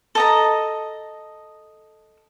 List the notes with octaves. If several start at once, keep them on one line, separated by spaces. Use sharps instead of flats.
A4 D#5 A#5